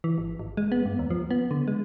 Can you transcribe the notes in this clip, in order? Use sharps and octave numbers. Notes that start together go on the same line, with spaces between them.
E3
G#1
G#1
G#3
B3
G2
D#2
F3
B3
D3
G#3